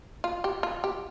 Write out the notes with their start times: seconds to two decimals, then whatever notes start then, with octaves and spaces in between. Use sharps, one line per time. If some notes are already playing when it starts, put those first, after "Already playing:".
0.24 F4
0.44 G4
0.63 F4
0.84 G4